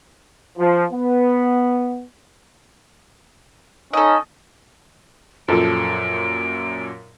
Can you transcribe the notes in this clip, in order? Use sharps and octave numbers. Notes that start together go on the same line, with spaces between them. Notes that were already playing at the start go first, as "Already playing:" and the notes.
F3
B3
C#4 D#4 A4 D#5
F#2 A#2 F3 A4 D7